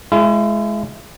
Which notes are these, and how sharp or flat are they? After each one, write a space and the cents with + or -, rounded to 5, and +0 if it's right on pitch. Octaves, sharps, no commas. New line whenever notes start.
G#3 +25 E4 +40